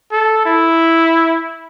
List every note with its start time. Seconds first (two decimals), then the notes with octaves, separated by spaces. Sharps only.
0.12 A4
0.45 E4